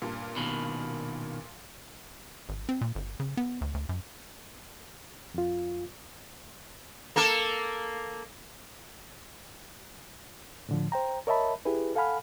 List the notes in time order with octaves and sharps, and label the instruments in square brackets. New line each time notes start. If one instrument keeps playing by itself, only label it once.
[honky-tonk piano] G2 A#2
[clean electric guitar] B2 D#3
[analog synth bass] G#1
C4
A#2
G1
C#3
B3
D2
D2
F#2
[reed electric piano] F2 F4
[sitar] A#3 A4 A#4
[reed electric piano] A2 D3 F3
C5 G5 A#5
A#4 C#5 D#5 E5 A5 B5
E4 G4 G#4 B4
A4 F5 F#5 G#5 B5 F6